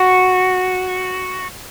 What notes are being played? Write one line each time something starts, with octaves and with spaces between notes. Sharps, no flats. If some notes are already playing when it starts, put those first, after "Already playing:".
Already playing: F#4